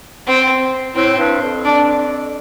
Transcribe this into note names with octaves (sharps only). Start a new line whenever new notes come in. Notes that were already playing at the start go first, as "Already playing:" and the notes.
C4
A2 C4
G2
F2
D4